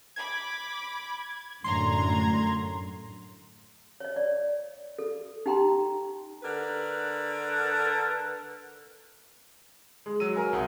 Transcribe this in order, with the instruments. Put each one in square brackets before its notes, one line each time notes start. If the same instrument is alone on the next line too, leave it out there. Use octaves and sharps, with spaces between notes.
[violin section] B5 D6 [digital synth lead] G#6
[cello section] F#2 A2 D3 [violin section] A#5 G#6 [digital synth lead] C6
[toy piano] C#5 D#5
D5
A4
D#4 G4 G5 A#5 C6
[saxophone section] D3 A#4 B4
[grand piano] G#3
[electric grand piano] F#3 E6 D#7
[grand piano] A#4 G#5 A#5
[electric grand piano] C2 F#5 D#6